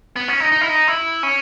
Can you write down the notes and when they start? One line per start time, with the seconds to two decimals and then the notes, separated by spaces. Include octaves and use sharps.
0.16 B3
0.28 C#4
0.40 D#4
0.52 D#4
0.61 E4
0.69 D#4
0.88 E4
1.23 C#4